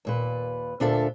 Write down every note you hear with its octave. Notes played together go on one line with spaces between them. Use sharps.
D#2 A#2 B4
D2 A#2 D4 F4 A4 E5